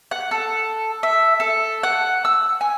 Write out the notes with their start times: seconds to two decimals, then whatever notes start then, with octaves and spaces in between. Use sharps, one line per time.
0.11 F#5
0.31 A4
1.03 E5
1.40 A4
1.83 F#5
2.25 E6
2.61 G#5